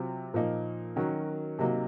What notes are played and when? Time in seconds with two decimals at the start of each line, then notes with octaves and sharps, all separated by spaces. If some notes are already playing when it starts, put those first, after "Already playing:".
Already playing: C3 F#3 C4 F4
0.34 A#2 F3 A#3 D#4
0.96 D#3 F#3 C#4 F#4 A#4
1.59 C3 F#3 A#3 D#4